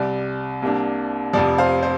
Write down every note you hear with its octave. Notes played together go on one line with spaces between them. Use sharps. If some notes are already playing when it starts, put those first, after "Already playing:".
Already playing: C2 C3 G3 D5
C2 C3 A#3 D4
F1 F2 C3 F3 D5
C5 F5
C5